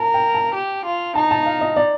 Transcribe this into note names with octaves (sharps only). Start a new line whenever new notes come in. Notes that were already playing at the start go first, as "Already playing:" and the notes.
Already playing: A#4 A5
G5
A5
G4
F4
D#4 A5
A5
F5
D#5
D5